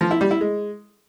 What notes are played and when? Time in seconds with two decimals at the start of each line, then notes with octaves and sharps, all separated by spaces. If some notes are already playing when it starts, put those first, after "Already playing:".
0.01 F3
0.11 E4
0.21 G3
0.31 E4
0.41 G#3